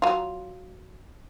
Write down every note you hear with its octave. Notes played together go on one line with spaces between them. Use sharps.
F#3 F4